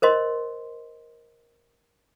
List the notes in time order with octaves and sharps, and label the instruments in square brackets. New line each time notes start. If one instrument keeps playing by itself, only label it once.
[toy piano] A#4 C5 D#5 C6